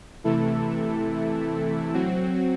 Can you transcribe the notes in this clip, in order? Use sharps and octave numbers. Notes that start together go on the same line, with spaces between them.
C3 E3 A3 E4 A4
F#3 C4 F#4